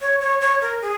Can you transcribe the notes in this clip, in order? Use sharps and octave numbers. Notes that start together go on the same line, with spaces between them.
C#5
C#5
C#5
A#4
G#4